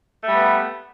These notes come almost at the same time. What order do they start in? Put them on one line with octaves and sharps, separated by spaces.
A3 G3 B3